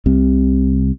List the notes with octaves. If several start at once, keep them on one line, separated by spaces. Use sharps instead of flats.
C2 C3